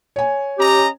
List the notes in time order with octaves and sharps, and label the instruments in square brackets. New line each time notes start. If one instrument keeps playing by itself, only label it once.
[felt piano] C#5 G#5
[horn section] C#4 D#5 A#5 [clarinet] G4